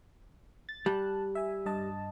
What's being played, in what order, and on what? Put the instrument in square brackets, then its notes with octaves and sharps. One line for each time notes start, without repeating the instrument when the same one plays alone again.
[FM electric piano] A6
[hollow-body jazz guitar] G3 [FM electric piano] A5 F#6
[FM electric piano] E5 G#5
G2 D#5 A5